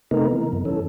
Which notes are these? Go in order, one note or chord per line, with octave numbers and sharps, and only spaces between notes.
C3 A3 B3 D#4 A#4
E3
F#2
E3 C#4 A4